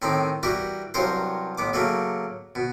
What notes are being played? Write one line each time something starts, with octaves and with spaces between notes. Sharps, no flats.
A2 D#3 C4 D#4
E3 G3 F#4 G4 A#4
C2 G2 F#3 C#4 A#4 C5
A1 B3 D6
C#3 F#3 A3 A#3 C#4
B2